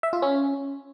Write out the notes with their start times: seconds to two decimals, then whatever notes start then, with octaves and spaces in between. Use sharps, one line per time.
0.03 E5
0.13 F4
0.22 C#4